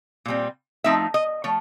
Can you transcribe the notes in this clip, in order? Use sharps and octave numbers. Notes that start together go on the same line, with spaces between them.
A#2 G3 C4
F3 A3 C4 D#4 E5
D#5
F3 A3 C#5